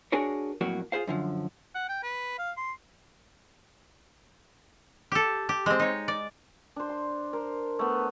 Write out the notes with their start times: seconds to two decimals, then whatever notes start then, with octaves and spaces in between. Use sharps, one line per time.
0.12 D4 F#4 G#4 A#4 C#5
0.61 F2 A2 F#3 A#3 F#4
0.92 F4 G#4 B4 C5 F5
1.07 F#2 D3 F3
1.75 F#5
1.89 G5
2.03 B4
2.38 F5
2.57 C6
5.12 G4 A4
5.49 G4
5.66 G#3 C4
5.79 D#4 C#5
6.08 D5
6.76 D4 C5
6.89 C6
7.33 A#4 C5
7.79 A3 B3